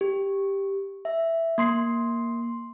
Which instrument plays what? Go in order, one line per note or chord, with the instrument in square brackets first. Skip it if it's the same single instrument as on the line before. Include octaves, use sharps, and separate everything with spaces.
[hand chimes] G4
E5
A#3 C6 C7